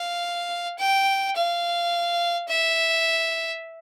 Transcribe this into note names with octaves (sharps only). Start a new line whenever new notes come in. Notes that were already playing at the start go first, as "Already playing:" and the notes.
Already playing: F5
G5
F5
E5